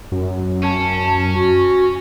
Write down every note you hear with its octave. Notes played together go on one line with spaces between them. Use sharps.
F#2
C#4 A5
F#4